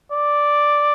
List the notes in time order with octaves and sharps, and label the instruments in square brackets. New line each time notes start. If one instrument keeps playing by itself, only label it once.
[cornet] D5